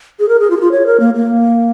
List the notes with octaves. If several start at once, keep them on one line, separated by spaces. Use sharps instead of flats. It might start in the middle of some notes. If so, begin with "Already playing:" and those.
G#4
A#4
G#4
F4
G#4
F4
C#5
A#4
A#3
A#3